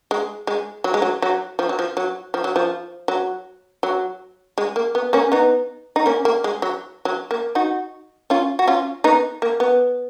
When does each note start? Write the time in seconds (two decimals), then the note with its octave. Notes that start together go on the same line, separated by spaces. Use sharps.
0.11 G#3
0.47 G#3
0.84 F#3
0.94 G#3
1.02 F#3
1.22 F#3
1.59 F3
1.69 F#3
1.79 F3
1.97 F#3
2.34 F3
2.44 F#3
2.56 F3
3.08 F#3
3.83 F#3
4.58 G#3
4.76 A#3
4.95 B3
5.13 A#3 C#4
5.32 B3 D#4
5.96 D#4
6.06 A#3 C#4
6.25 A#3
6.44 G#3
6.62 F#3
7.05 F#3
7.31 A#3
7.55 D#4 F#4
8.30 C#4 F4
8.59 F#4
8.67 C#4 F4
9.04 B3 D#4
9.42 A#3
9.60 B3